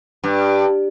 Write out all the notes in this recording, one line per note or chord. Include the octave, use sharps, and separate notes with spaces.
G2